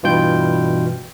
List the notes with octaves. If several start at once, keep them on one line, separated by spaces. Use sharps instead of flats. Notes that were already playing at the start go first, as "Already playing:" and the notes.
G2 B2 E3 F4 G5 G6